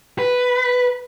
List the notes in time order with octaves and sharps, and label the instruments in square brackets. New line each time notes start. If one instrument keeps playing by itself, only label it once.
[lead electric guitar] B4